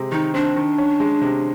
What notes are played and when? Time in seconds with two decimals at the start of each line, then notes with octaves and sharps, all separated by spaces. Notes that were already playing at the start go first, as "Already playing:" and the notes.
Already playing: C3 G#3 C4
0.12 D#3 D#4
0.34 C4 D4
0.56 D#3
0.78 C#4
1.00 G#3
1.22 C3